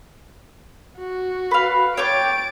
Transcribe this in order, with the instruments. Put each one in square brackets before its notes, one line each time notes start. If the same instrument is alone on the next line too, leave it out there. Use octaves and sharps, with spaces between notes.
[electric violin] F#4
[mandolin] B4 F5
[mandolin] C#5 G5 D6 [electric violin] A6 D7